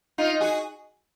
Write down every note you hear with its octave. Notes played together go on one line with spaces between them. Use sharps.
D#4 F4
F#4 G#4